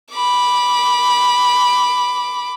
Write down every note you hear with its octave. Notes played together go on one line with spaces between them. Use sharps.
B5 D6